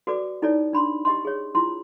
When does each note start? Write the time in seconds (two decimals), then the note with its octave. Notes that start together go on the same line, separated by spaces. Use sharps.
0.07 F#4 A4 B4 D5 D6
0.42 D#4 E4 A4 C#5 D5
0.73 D4 B5 C6
1.05 G4 D#5 C6
1.25 G#4 C#5
1.55 E4 F4 C6